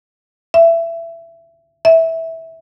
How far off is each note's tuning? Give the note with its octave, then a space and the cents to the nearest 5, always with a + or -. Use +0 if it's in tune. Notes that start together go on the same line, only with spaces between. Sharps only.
E5 +20
E5 -15